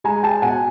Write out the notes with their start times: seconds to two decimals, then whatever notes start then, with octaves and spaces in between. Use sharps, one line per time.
0.04 G#3 G#5 A#5
0.23 G5 A5
0.42 B2 F#5 G#5